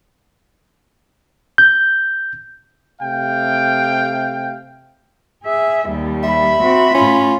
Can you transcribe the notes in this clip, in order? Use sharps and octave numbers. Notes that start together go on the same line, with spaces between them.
G6
C3 A3 F5 G5
G#4 E5
D#2 G3
E5 B5
C4 F#4
A2 C#4 F4